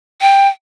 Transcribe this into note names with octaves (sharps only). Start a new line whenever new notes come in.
G5